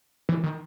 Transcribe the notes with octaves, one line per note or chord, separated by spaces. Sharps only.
E3
D#3